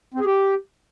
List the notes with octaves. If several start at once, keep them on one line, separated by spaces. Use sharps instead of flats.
C4
G#4
G4